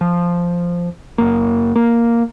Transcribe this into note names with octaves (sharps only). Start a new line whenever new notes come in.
F3
F#1 A#3
A#3